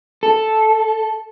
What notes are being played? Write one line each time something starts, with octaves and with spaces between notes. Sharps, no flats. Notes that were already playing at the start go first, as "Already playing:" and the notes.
A4